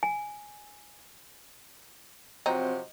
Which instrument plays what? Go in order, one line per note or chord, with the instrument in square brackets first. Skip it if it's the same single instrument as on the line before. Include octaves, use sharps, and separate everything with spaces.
[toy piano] G#5
[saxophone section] C3 F3 F#3 [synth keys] C4 [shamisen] D#4